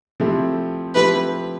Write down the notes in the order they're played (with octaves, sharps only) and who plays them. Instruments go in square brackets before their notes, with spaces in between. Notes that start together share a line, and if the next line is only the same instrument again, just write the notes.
[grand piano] F3 A3 C4 E4 G4
[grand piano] F3 A3 C4 E4 G4 [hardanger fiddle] B4